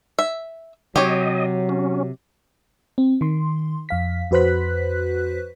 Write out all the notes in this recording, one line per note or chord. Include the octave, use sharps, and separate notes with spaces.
E5
C3 F#3 G4 C#5 D#5
C#4
C4
D#3 C6
F2 F5 B6
F2 F#4 B4 C5 F#6 B6